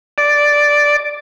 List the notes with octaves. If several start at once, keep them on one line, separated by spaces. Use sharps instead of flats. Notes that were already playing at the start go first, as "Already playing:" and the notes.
D5